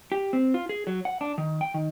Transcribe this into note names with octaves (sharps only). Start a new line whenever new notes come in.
G4
C4
F4
G#4
F#3
F#5
D4
D#3
G5
D#3